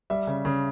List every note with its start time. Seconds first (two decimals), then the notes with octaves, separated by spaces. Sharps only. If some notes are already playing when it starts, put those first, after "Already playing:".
0.10 G3 E5
0.27 C#3
0.45 C#3